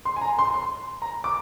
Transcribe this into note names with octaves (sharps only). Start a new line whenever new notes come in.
C6
G#5
A#5
C6
C6
A#5
D6